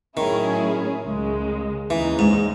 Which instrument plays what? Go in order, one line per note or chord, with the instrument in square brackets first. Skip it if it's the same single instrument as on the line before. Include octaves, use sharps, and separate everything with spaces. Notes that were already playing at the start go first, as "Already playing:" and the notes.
[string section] A2 F#3 C#4 E4 G#4 [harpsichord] D#3
[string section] C#2 C#3 G#3
[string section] D#2 C#3 G#3 D#4 [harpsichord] E3
[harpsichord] G#2